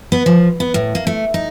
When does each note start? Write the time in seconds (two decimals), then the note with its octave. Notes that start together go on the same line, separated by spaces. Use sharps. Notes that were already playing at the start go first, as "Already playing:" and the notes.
0.12 B3
0.26 F3
0.60 B3
0.74 A2
0.95 A#3
1.07 A3
1.34 D#4